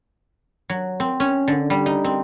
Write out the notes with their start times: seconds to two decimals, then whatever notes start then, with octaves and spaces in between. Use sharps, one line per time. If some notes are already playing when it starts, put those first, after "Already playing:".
0.70 F#3
1.00 C4
1.20 C#4
1.48 D3
1.70 G3
1.86 D#4
2.05 C4